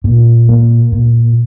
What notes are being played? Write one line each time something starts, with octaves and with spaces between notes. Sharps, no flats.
A#2
A#3
A#2